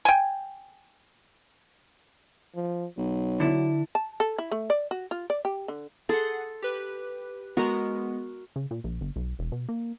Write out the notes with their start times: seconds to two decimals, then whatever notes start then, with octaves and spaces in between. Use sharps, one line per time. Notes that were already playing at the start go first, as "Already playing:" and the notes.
0.05 G5 G#5
2.55 F3
2.98 B1 F#3
3.40 D3 E4
3.95 A5
4.20 A4
4.38 E4
4.51 A3
4.70 D5
4.91 F#4
5.11 F4
5.30 D5
5.45 G4
5.68 D3
6.09 G#4 A4 F#5 C6
6.62 G4 B4
7.57 G#3 B3 F#4 A#4 A#5
8.56 C#3
8.71 A#2
8.84 A#1
9.01 G1
9.16 B1
9.39 E1
9.52 B2
9.69 A#3